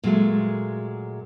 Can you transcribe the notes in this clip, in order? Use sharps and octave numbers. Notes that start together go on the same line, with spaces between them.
A#2 F#3 G#3 A3